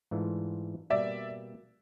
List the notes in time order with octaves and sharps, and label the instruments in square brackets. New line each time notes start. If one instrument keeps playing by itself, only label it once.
[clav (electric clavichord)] G#2 E3 A3 D4 F4
[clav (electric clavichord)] B2 G3 A#3 [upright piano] D5 E5